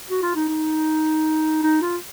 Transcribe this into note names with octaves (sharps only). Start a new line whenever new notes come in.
F#4
F4
D#4
D#4
D#4
F4